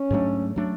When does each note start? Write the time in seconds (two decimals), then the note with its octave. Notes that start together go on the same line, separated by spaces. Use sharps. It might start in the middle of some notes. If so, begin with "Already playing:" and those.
Already playing: C#4
0.11 G#2 F#3 A3 D4
0.56 F#3 A3 D4